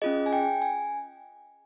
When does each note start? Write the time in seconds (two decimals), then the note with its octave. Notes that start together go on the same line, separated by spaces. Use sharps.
0.02 C#4 F4 G#4 D#5
0.26 G#5
0.33 G5
0.62 G#5